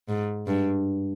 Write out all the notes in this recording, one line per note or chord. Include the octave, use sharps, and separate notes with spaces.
G#2
G2